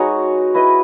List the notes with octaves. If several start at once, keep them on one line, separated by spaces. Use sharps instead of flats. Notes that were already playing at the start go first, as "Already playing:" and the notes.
Already playing: G#3 D#4 F#4 B4 C#5
E4 B4 D#5